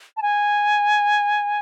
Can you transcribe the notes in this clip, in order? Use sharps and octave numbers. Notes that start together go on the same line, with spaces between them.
A5
G#5